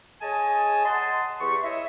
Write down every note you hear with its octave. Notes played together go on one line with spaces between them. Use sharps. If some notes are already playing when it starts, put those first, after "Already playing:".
G#4 C#5 D#5 G#5 A5
D#5 F#5 A5 C6
E2 G4 C#6
E4 C#5 D#5 E5